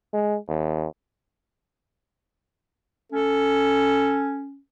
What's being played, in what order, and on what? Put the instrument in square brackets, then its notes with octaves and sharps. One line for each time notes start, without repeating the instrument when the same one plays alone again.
[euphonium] G#3
D#2
[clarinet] C#4 [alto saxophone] A4